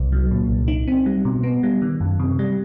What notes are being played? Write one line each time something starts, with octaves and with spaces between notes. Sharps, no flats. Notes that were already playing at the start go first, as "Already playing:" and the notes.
Already playing: C2
F#3
A#2
C2
D#4
C4
G3
B2
B3
G3
D#3
F#2
C3
G3